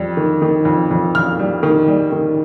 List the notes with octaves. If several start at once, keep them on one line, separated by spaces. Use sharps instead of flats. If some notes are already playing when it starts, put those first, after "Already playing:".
Already playing: F2 G3
D#3
D#3
F2
F2
F2 F6
G3
D#3
G3
D#3